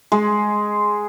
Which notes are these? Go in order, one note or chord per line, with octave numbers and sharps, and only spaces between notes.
G#3